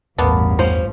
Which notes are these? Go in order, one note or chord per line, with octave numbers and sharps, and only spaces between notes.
A1 E2 G2 A#3 B3 A5
F3 C#4 C5